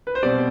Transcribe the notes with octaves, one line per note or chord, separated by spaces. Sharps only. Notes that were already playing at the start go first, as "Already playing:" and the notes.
B4
C5
B2 G3 C4 D5